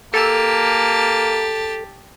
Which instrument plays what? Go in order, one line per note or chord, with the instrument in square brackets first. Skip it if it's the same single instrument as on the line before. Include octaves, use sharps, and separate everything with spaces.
[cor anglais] A#3 [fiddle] G4 A5 [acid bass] A4